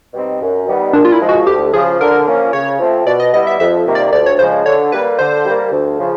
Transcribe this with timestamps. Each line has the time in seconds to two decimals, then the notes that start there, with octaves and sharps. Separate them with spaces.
0.14 B2 G3 C4 D#4
0.41 F#2
0.67 D#3 G3 B3
0.93 A#2 D4
1.05 F4
1.12 E4
1.21 F3 G#3
1.29 F#4
1.47 D2 G4
1.73 C#3 F3 G#4
2.00 D3 A#4
2.27 F3 A#3 C#4
2.53 C#3 C#5
2.79 F3 A3 C4
3.06 B2 D5
3.20 D#5
3.33 G3 B3 E4 D#5
3.47 E5
3.59 F2 E5
3.87 C3 D#3 G3 A#3
3.95 D5
4.13 D2 D5
4.26 C#5
4.39 C#3 F3 G#3 C5
4.65 D3 C#5
4.92 G3 A#3 B4
5.19 D3 C5
5.46 G3 A#3
5.72 D2
5.99 C#3 F3